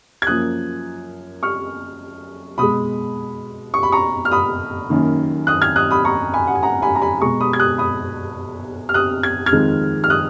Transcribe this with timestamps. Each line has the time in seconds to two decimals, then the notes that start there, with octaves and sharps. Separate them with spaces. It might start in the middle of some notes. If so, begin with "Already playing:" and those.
0.22 G#6
0.27 F#2 F3 A#3 D#6 F#6
1.43 C#6 F6
2.58 B2 G#3 B5 D#6
3.74 C#6
3.83 B5
3.92 A#5 C#6
4.25 F6
4.32 B5 D#6
4.90 F#2 D#3 A#3
5.47 D#6 F#6
5.61 F6 G#6
5.76 D#6 F#6
5.91 B5 D#6
6.05 A#5 C#6
6.34 G#5 B5
6.47 F#5
6.55 G#5
6.63 F#5 A#5
6.82 G#5 B5
6.95 A#5
7.02 G#5 B5
7.21 B2 G#3 A#5 C#6
7.40 B5 D#6
7.53 G#6
7.60 D#6 F#6
7.78 B5 D#6
8.89 F6
8.94 D#6 F#6
9.23 G#6
9.46 F6 G#6
9.52 F2 D#3 G#3
10.04 F6
10.10 D#6 F#6